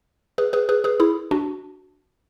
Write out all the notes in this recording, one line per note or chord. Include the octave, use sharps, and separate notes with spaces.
G#4 B4
G#4 B4
G#4 B4
G#4 B4
E4 G#4
D4 F#4